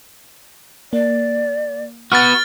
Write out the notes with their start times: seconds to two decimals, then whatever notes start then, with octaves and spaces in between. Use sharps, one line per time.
0.93 A#3 D5
2.12 B3 F#4 F6 A6